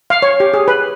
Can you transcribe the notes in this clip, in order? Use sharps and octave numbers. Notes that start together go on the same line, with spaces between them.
F5
C#5
G4
G#4
B4